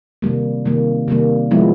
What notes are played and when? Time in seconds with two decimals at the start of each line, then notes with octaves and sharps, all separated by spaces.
0.22 C3 D#3 G3 A#3
0.65 C3 D#3 G3 A#3
1.08 C3 D#3 G3 A#3
1.51 C3 F3 G#3 B3 E4